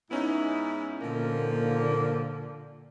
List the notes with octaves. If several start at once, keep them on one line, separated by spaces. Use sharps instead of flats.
G#2 B3 C#4 D#4 E4
A#2 D3 F3 A#3